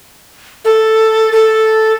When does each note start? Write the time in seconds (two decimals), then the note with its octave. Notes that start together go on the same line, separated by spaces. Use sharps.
0.65 A4
1.33 A4